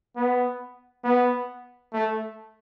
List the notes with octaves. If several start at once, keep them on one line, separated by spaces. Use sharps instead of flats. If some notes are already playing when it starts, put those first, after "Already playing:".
B3
B3
A3